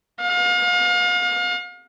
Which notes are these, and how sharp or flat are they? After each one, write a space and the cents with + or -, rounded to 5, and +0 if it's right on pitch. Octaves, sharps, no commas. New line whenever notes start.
F5 +40